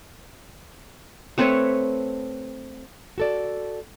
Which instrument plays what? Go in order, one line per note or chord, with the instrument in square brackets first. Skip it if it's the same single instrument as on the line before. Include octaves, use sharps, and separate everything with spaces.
[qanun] A3 C4 B4 C#5
[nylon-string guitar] F#4 A4 D5